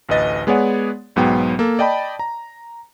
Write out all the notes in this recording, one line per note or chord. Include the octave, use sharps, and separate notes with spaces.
A1 D2 B4 D#5 A6
G#3 B3 G#4 C#5 D5 F#5
B1 G#2 F#3 B3 G5
A#3 A4
D5 D#5 G5 A5 B5
A#5